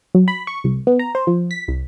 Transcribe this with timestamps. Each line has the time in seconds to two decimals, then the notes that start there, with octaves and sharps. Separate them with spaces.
0.15 F#3
0.28 B5
0.47 C#6
0.64 C2
0.87 B3
0.99 A#5
1.15 C5
1.27 F3
1.51 B6
1.68 C2